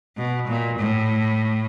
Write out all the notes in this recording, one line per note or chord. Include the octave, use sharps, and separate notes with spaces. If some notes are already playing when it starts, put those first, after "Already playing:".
B2
A#2
A2